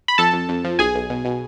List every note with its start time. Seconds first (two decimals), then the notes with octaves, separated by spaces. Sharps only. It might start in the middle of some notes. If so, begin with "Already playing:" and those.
0.08 B5
0.18 F2 A4 A5
0.33 F2
0.49 F2
0.64 F3
0.79 B1 G#4 G#5
0.95 B1
1.10 B2
1.25 B2